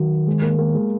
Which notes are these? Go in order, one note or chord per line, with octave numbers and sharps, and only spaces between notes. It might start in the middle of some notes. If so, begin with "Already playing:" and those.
Already playing: D#3 F#3
G#3
A#3
A#3
G#3